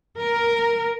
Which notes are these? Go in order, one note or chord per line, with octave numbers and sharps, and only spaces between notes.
A#4